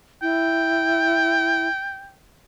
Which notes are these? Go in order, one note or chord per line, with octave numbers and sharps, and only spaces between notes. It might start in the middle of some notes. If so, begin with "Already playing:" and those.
E4 G5